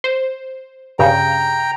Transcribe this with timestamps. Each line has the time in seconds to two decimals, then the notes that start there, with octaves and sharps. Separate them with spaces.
0.04 C5
0.99 G2 C#3 G5 A#5